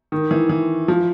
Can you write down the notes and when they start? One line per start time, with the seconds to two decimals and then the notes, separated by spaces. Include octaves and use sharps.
0.12 D#3
0.31 E3
0.49 E3
0.88 F3